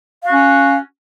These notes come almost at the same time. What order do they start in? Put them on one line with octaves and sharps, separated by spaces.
F5 F#4 C#4